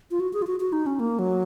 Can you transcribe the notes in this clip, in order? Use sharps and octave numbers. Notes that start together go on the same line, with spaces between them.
F4
F#4
G#4
F4
F#4
F#4
D#4
C#4
A#3
F#3